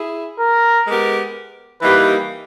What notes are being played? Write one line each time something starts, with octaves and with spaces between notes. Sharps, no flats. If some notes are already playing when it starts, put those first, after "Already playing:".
Already playing: E4 G#4
A#4
G#3 B3 G4 A#4
E3 G3 A#3 D#4 G4 B4